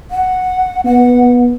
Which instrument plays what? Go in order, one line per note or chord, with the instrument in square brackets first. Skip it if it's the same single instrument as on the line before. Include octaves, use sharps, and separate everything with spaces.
[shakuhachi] F#5
[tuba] B3 [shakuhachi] F#5